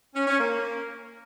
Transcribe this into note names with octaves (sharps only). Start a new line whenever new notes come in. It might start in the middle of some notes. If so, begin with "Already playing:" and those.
C#4
C#4
A#3